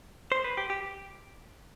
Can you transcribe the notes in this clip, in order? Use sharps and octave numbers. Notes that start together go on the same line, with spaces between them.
C5
B4
G4
G4